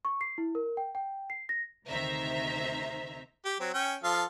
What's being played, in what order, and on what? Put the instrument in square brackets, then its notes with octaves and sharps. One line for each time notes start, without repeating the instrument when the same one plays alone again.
[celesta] C#6
C7
E4
A#4
G5
G5
C7
A#6
[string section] D2 C3 D#3 C5 E5 A#5
[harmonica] G4
F#3 C4
C#4 G5
F3 A4 F5